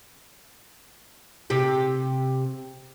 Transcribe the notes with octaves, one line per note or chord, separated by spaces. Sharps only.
C3 G4